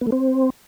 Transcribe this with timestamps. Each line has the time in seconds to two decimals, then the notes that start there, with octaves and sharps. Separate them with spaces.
0.01 B3
0.07 A3
0.12 C4